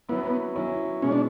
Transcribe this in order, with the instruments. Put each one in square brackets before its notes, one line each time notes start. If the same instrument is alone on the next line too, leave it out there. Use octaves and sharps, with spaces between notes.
[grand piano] F#3 C#4 E4 [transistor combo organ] B3
[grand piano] F#3 C#4 E4
[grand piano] B2 G#3 B3 [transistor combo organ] C#4
[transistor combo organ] D4